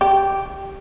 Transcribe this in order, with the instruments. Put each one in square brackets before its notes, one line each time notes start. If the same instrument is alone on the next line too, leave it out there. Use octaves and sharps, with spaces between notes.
[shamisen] G4